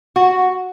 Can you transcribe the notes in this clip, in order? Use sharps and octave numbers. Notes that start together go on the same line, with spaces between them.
F#4